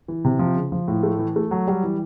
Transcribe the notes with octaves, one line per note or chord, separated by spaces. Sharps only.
E3
C3
F3
C#3
F3
A2
A3
E3
A3
F#3
G3
E3